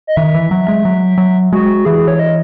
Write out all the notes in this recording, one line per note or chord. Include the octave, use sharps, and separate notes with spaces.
D#5
D#3 E5
E3
F#3
G#3
F#3
F#3
G#3 F#4
E3 G#4
C#5
D#5